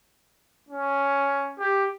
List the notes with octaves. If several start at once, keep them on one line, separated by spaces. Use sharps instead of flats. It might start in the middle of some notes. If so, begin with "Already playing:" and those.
C#4
G4